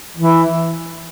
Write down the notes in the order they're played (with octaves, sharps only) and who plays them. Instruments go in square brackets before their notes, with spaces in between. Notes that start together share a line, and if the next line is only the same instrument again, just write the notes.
[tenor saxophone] E3